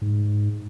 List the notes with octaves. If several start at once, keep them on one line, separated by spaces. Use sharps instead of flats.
G#2